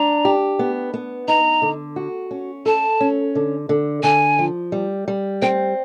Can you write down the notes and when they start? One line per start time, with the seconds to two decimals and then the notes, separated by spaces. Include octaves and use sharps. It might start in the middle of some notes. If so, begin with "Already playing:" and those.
Already playing: D4 A#5
0.25 G4
0.59 B3
0.94 B3
1.28 D#4 A#5
1.62 D3
1.96 F#4
2.31 C#4
2.66 A4 A5
3.00 C#4
3.35 D3
3.69 D3
4.03 D3 G#5
4.39 F3
4.72 G3
5.08 G3
5.42 C4 G5